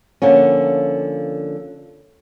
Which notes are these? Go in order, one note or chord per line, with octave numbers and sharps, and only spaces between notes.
D3 F3 A#3 C#4